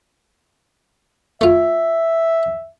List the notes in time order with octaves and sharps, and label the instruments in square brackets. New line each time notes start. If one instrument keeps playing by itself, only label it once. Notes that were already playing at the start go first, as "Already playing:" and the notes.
[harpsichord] A3 F4 [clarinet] E5